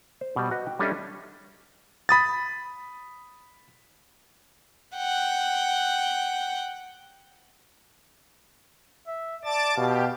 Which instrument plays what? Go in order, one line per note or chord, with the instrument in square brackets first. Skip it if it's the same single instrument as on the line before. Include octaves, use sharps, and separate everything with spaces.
[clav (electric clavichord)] C5
B2 G3
F#4 B4 D#5
G5
G3 C#4 D4 A4 D#5 E5
[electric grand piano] B5 D#6 A6
[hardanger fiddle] F#5 G5
[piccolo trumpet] E5
[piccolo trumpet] D5 [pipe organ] A5 D6 A6
[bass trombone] B2 [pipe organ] G4 [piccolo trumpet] F5